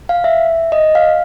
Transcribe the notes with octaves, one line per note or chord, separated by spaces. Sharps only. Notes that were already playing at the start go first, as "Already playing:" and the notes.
F5
E5
D#5
F5